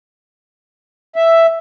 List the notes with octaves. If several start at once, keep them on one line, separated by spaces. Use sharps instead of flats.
E5